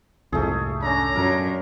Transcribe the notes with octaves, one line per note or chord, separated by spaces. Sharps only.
C2 F2 G#2 A3 G#4
C#4 D4 A#5
F#2 A#4